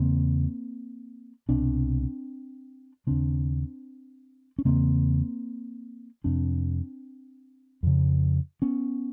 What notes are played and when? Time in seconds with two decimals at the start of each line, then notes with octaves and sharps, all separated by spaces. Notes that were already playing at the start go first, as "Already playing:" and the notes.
Already playing: E2 C#3 A#3 C4
1.49 C2 B2 C4 D4
3.07 D#2 C#3 C4 D4
4.59 C#4
4.65 E2 C#3 A#3 C4
6.24 F2 C3 C4 D4
7.83 F2 C#3
8.62 B3 C#4